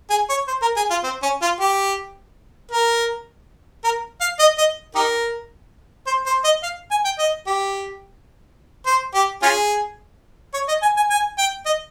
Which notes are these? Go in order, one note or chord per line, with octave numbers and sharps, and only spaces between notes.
G#4
C#5
C5
A#4
G#4
F4
C4
C#4
F4
G4
A#4
A#4
F5
D#5
D#5
D#4 G4 A#4
C5
C5
D#5
F5
G#5
G5
D#5
G4
C5
G4
C#4 F4 G#4
C#5
D#5
G#5
G#5
G#5
G5
D#5